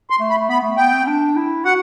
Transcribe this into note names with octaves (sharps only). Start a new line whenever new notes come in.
C6
A3
B5
A3
B3 B5
A3
B3 G5
C4
D4
E4
F#4 F#5